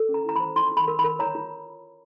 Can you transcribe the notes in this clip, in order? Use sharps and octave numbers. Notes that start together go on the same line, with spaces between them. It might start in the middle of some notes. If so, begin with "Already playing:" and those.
Already playing: A4
C#4
A#5
E4 A#5
C5 B5
F4 C6
F4
B5
A#4
B5
A#4
C#5 A#5
F4